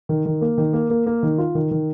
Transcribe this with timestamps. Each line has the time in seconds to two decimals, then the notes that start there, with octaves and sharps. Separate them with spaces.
0.09 D#3
0.25 D#3
0.41 A#3
0.58 D#3
0.73 A#3
0.90 A#3
1.06 A#3
1.23 D#3
1.38 F4
1.55 D#3
1.71 D#3